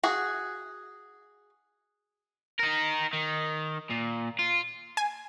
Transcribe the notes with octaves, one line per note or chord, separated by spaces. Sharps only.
F#4 G#4
D#4 A#4
D#3
A#2
F4
G#5